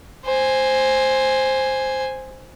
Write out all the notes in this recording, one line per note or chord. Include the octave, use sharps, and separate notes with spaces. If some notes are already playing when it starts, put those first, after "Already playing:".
C5 G#5